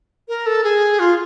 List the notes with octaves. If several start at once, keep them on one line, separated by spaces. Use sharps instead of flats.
A#4
A4
G#4
F4